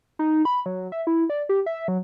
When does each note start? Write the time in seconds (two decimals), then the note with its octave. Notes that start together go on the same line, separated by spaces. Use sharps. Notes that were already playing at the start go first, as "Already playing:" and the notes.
0.19 D#4
0.45 B5
0.66 F#3
0.92 E5
1.07 E4
1.30 D5
1.49 G4
1.66 E5
1.88 F#3